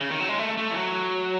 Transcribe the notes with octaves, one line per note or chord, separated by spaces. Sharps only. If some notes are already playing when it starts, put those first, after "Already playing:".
C#3
D#3
F#3
G#3
A3
A3
E3
F#3